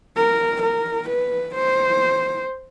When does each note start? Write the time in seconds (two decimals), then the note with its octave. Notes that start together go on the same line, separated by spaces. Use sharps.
0.17 A#4
0.63 A#4
1.09 B4
1.55 C5